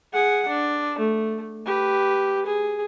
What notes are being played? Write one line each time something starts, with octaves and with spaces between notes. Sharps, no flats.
G#4 F#5
D4
A3
G4 B4
G#4